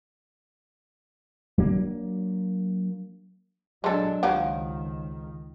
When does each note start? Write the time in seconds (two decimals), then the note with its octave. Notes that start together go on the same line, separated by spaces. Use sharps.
1.58 F#3 A#3 D4
3.84 F#3 G#3 D4 A4
4.23 C#2 D#3 F3 F#3 G4